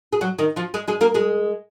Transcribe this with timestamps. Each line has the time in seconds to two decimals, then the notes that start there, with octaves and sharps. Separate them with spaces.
0.13 G#4
0.21 F#3 F#4
0.39 D#3 D#4
0.56 F3 F4
0.74 G#3 G#4
0.88 G#3 G#4
1.01 A#3 A#4
1.14 G#3 G#4